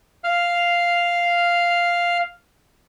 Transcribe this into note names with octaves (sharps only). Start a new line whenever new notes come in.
F5 F6